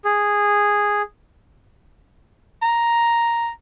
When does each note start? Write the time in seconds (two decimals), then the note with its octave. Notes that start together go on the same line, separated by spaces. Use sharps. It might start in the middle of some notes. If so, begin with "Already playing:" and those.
0.05 G#4
2.62 A#5